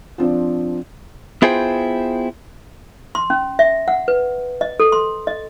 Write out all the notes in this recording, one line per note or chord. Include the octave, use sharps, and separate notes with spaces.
F3 C4 D4
B3 E4 F4 G#4 C5 G5
C6
C#4
E5
F#5
B4
D#5
A4
C6
D#5